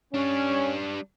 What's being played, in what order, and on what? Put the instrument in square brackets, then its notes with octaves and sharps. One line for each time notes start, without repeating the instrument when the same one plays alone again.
[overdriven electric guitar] G3 D4 [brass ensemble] C#4